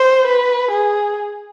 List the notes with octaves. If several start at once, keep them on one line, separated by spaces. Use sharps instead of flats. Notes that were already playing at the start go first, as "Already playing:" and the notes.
Already playing: C5
B4
G#4